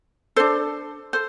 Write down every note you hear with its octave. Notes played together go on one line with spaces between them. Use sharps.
D4 A4 C5
A4 C5